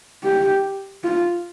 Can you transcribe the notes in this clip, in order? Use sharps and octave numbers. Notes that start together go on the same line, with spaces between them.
G4
F4